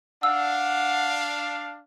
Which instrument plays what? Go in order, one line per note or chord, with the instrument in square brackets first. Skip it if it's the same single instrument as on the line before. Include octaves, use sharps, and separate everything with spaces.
[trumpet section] D4 F5 [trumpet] F#5 [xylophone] E6